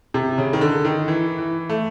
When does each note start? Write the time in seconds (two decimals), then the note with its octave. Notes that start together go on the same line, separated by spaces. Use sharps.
0.14 C3
0.38 C#3
0.53 D#3
0.61 D3
0.85 D#3
1.08 E3
1.38 E3
1.69 A3